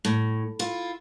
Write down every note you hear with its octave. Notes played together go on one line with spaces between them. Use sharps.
A2
E4 F4